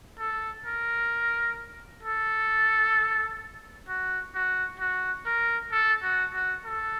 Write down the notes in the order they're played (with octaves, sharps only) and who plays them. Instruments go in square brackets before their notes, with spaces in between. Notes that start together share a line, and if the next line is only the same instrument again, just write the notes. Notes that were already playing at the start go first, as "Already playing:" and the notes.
[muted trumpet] A4
A#4
A4
F#4
F#4
F#4
A#4
A4
F#4
F#4
A4